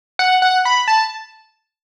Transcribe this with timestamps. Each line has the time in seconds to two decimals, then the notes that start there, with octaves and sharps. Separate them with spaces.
0.19 F#5
0.42 F#5
0.65 B5
0.88 A5